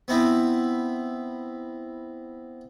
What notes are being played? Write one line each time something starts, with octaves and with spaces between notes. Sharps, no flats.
B3 C4 E4